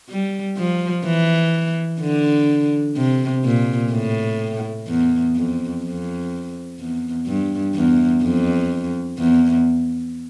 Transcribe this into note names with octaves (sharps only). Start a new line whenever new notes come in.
G3
F3
E3
D3
C3
A#2
A2
E2
F2
F2
E2
G2
E2
F2
E2